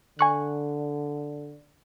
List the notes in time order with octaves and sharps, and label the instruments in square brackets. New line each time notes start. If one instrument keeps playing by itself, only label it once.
[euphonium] D3 [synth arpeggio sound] G#5 C#6 F#6